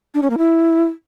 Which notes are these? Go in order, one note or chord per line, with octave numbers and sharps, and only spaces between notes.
D4
C#4
A#3
E4